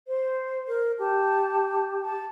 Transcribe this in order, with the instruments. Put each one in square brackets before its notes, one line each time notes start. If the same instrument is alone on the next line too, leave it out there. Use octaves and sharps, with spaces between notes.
[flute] C5
[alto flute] A#4
[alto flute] G4 [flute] A5
[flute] A5